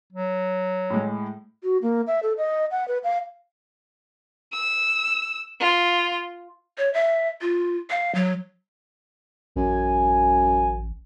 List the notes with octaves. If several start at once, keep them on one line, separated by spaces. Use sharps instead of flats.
F#3
A2 G#3
F#4
A#3
E5
A4
D#5
F#5
B4
F5
E6
F4
C#5
E5
F4
F5
F#3
A1 F#2 G#5